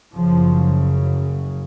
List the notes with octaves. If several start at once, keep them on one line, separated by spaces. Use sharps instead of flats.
F#1 F#2 C#3 F3